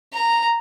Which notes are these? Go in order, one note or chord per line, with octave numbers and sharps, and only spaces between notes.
A#5